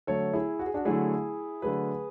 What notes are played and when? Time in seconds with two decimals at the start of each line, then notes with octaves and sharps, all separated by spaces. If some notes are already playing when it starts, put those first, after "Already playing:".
0.07 D3 F#3 A3 A4 C#5
0.33 E4 G#4
0.59 F#4
0.66 G#4
0.74 D4 F#4
0.85 D3 F#3 A3 E4 G#4
1.62 D3 F#3 A3 G#4 B4